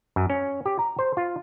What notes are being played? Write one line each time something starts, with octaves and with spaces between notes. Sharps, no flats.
F#2
C#4
G4
A#5
C5
F4